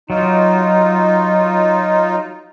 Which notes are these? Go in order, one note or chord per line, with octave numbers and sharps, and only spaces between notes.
F#3 D#4 F4